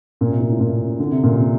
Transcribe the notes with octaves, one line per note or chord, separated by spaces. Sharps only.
A#2
C3
A#2
A2
A#2
D3
C3
A#2
C3